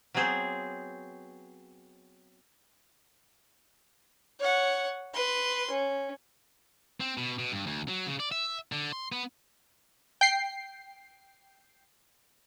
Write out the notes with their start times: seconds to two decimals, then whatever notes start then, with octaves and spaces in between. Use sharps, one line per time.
0.14 F#3 B3 C4 G#4 C5
4.40 C#5 F#5
5.13 B4 C6
5.71 C#4
7.00 C4
7.17 B2
7.39 B2
7.52 G2
7.67 D2
7.88 F#3
8.07 C#3
8.20 D5
8.32 E5
8.72 D3
8.93 C6
9.12 B3
10.21 G5 C7